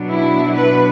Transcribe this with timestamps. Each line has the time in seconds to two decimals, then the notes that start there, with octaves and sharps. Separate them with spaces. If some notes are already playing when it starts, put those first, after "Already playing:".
Already playing: B2 F#3 B3 D4
0.10 E4
0.56 B4